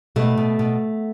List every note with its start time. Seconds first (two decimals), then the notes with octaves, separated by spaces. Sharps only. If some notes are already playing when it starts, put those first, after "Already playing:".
0.16 B2 A3
0.37 B2
0.59 B2